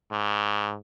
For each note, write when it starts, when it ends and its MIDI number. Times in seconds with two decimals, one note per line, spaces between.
0.11 0.76 44